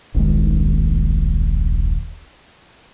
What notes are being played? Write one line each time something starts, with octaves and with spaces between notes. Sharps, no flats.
D#1 B1 D#3 G#3